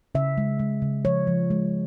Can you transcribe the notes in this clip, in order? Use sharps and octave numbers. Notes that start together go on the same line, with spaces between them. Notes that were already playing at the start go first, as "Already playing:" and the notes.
C#3 E5
G#3
G#3
C#3
F3 C#5
F3
G#3